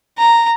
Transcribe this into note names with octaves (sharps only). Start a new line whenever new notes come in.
A#5